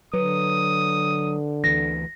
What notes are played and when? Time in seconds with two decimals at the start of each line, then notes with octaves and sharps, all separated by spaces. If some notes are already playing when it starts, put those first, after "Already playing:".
0.13 D3 F#3 B4 D#6
1.64 D2 E3 A#6